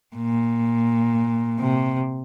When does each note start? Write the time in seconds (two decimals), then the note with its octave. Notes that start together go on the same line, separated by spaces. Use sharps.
0.16 A#2
1.60 C3